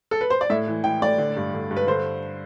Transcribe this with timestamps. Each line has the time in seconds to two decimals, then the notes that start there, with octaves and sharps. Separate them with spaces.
0.11 A4
0.21 B4
0.30 C5
0.41 D5
0.50 A2 E5
0.67 E3
0.84 E3 G5
1.02 A2 D5
1.18 D3
1.37 G2
1.54 D3
1.71 G2
1.76 B4
1.87 D3 C5